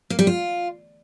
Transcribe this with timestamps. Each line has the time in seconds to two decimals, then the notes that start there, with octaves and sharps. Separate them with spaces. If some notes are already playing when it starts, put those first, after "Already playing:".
0.10 A#3
0.19 G3
0.27 F4